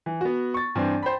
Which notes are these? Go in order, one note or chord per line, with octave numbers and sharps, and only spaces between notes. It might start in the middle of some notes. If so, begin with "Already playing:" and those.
E3
B3 F#4
C#6 A6
G2 E3 C4
C5 G5 B5